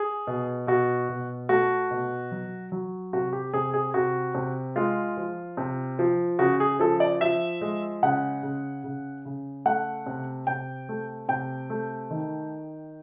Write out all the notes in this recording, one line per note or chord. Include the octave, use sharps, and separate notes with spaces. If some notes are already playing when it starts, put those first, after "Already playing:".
Already playing: G#4
B2
B2 F#4
B2
A3 F#4
B2
F#3
F#3
C3 F#4
G4
C3 G#4
G#4
C3 F#4
C3
G#3 F4
F3
C3
F3
C#3 F#4
G#4
F3 A4
D5
F3 E5
G#3
C#3 F#5
C#3
C#3
C#3
A3 F#5
C3
C3 G5
A3
C3 G5
A3
D#3